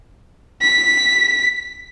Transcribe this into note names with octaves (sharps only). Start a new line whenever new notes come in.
B6